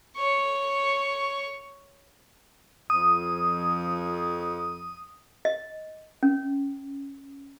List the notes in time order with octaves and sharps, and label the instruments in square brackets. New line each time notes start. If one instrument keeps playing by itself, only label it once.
[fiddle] C#5 C#6
[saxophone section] F2 [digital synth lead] D#6
[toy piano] D#5
C#4